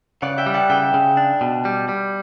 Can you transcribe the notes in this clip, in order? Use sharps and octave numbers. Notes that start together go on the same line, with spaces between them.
C#3 D5 F#5
E5 G5
G3
F#5 A5
C#3 E5 G5
C#3
D4
B2
G3
G3